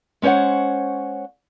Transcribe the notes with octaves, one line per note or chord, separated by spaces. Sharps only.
G#3 C#4 C5 C#5 F#5